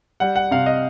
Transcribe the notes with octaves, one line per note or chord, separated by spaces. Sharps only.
G3 F#5
F#5
C3 F5
D#5